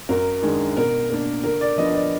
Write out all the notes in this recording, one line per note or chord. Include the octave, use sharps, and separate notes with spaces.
F#2 A#4
D#3 G#3 D4
B2 A#4
A#3 D4
D3 A#4
D5
F3 B3 D4 D#5
D#5
D5